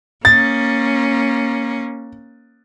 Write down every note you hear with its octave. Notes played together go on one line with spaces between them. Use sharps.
A#3 C#4 A6